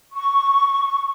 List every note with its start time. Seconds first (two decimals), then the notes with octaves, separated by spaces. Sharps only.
0.12 C#6